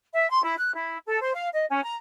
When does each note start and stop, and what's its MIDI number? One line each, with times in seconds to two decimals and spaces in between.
0.14 0.29 76
0.30 0.41 84
0.42 0.55 64
0.58 0.74 90
0.75 0.98 64
1.06 1.19 69
1.21 1.32 72
1.34 1.48 77
1.53 1.65 75
1.70 1.83 61
1.84 1.94 82